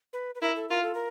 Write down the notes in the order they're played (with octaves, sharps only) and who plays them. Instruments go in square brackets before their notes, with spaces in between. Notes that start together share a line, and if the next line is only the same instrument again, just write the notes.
[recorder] B4
B4
[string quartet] E4 [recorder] A#4
[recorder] A4
[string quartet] F4 [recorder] A#4
[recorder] A4
A#4